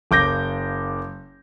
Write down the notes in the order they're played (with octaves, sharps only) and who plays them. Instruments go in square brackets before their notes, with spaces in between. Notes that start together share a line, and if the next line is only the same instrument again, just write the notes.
[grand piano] F#1 D6 G6 A#6